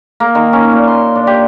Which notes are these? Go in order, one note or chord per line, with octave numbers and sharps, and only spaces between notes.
A#3
D#3
C#4
A#2
C6
D4
G4